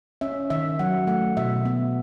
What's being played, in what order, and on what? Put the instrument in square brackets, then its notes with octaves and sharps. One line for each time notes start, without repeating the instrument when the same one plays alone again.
[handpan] C#4 E5
D#3 E5
F#3 F#5
A3 F#5
B2 E5
B3